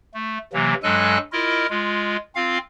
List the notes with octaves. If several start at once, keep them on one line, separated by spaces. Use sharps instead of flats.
A3
C3 E3 F#3 A#3
G2 F#3 G#3 A4 G#5 F#6
E4 F4 A#4 D#5
G#3 F4
C4 F4 F5